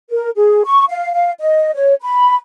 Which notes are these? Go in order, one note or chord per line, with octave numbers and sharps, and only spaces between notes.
A#4
G#4
C#6
F5
F5
D#5
C#5
B5